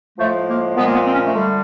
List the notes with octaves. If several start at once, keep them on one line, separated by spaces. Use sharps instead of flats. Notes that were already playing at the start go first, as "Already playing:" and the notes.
A2 F3 G#3 A3
A#3
A#2 F3 G#3 B3
A#3
B3
C4
C#4
A3
D3 G3